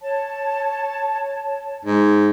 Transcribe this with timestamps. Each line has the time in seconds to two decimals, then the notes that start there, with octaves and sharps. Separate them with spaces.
0.01 C#5 A5
1.85 G#2